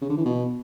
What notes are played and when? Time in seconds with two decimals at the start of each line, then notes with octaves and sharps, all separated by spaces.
0.02 C#3
0.09 D3
0.17 E3
0.25 B2